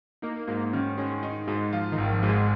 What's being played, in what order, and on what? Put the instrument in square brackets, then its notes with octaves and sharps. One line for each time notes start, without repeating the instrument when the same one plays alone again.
[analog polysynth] A#3 [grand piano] D#4
[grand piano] G#2 [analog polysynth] A#3
[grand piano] D#3 [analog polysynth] C#4
[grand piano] G#3 [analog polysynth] C#4
[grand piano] D#4
[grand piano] G#2 [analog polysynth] G#3
[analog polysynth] F3 [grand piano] F4
[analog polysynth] D#3
[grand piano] G#1
[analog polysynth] F3
[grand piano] G#2
[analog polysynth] G#3